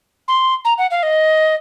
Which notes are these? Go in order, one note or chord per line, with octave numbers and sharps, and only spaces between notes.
C6
A#5
F#5
F5
D#5